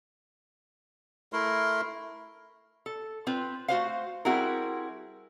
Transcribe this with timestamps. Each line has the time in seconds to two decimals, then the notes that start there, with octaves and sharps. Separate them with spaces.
1.33 A3 E4 A#4 C6
2.86 A4
3.27 C4 F4 B4
3.68 A3 F#4 C5 F5
4.25 G3 C4 E4 F#4 G#4 A#4